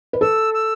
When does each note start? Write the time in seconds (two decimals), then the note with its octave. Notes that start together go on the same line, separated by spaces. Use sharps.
0.13 B4
0.21 A4 E6
0.54 E6